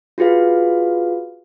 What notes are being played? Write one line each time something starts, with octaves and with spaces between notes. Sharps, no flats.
F4 F#4 G#4 B4 F5